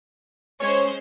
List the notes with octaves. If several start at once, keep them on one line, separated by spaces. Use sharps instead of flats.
G#3 C#4 C5 C#5